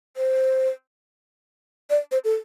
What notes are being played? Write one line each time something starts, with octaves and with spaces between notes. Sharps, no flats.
C5
D5
C5
A4